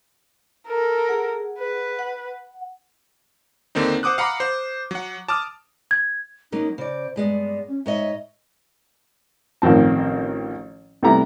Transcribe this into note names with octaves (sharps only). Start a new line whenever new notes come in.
A4 A#4
G#4 F#5
B4
F#5
D#2 D3 A#3 C4 D#4
C5 F#5 D6 D#6 F#6
F5 F#5 A#5 B5 D6
C5
F#3 F#5
A5 D6 D#6 F6
G#6
F#3 A#3 C#4 D#4
C#3 C5 D5
G2 G#3 B3 D5
C#4
G#2 C#5 D#5 E5
A1 D#3 F3 C4 A5
C3 G3 A3 B3 E4 A#5